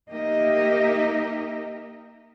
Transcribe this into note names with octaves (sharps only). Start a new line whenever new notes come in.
A#3 D#4 G4 A#4 D#5 E5